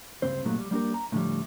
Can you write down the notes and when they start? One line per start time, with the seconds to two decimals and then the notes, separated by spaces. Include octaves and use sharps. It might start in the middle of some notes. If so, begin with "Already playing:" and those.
0.22 C#2 G2 C4 C5
0.45 G2 A#2 F#3 A3 D#4
0.58 G3
0.71 G3 A#3 D4 G4 A#4
0.94 A#5
1.12 A2 D3 F3 G3